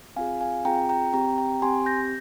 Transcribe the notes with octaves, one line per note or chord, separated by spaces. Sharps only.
C4 F4 G#4 F5 G#5
F5 G#5
C4 F4 G#4 G5 A#5
G5 A#5
C4 G4 G5 A#5
G5 A#5
C4 G4 G#5 C6
G6 A#6